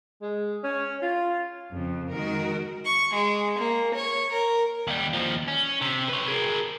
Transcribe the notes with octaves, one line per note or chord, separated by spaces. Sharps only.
G#3
C#4
F4
F2 C#3
D#3 G#3 F#4 A#4
C#6
G#3
A#3
C#5
A#4
D#2 G3
D#2 F3
C#4
C3
B4 C#5
G#4 A#4